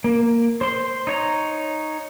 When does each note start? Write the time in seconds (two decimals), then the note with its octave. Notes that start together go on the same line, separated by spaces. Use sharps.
0.04 A#3
0.61 C5 C6
1.07 D#4 C#5 A#5